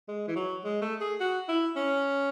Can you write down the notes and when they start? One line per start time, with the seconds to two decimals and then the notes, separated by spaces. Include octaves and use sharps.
0.08 G#3
0.27 E3
0.36 F#3
0.64 G#3
0.82 A3
1.01 G#4
1.20 F#4
1.48 E4
1.76 C#4